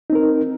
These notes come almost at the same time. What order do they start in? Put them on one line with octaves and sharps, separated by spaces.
D#4 C4 A#4